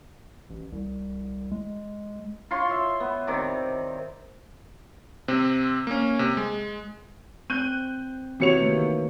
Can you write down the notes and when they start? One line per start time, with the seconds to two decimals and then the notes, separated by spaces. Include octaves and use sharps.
0.50 A1
0.72 C2
1.52 G#3
2.51 F4 C#5 C6
2.71 E5
3.00 B3
3.27 C3 D#3 D5
5.28 C3 C4
5.87 A#3 C#4
6.19 C3
6.37 G#3
7.50 C4 F#6 G6 D#7
8.40 C3 E3 F#4 C#5 C#7 F7
8.61 D#3 A3 A#3